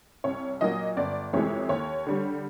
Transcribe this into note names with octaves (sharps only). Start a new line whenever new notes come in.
C2 C#5
A#2 F#3 A#3 D#5
G1 D5
F2 C3 E3 G#3 C#5
D#2 C#5
D3 G3